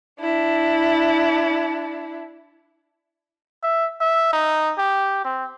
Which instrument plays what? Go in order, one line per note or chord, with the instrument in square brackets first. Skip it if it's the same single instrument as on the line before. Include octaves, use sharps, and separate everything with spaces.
[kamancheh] D4 E4
[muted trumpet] E5
E5
D#4
G4
C4